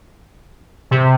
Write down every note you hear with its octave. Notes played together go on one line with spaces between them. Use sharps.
C3